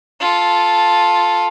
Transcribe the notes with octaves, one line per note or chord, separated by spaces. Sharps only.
F4 A4